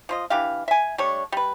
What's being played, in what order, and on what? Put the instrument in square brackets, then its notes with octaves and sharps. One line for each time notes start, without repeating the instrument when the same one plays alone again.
[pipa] F3 F4 D#5
E3 D4 G4 F5
E5 G#5
G3 A3 D4 C#5
G3 B4